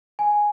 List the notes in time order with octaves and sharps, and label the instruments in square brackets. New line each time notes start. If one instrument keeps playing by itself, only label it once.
[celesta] G#5